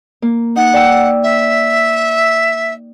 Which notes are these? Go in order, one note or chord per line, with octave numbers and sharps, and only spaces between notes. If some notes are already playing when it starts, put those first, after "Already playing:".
A#3
D#4 F#5
D5 G5 E6
E5